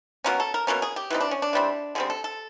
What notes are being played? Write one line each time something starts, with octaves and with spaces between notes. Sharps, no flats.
B2 F#3 A#3 C#4 A#4
A4
A#4
B2 F#3 A#3 C#4 A#4
G#4
G4
E3 G3 C4 D#4
D4
C#4
D4
E3 G3 C4
D3 G3 C4 G#4
A4
A4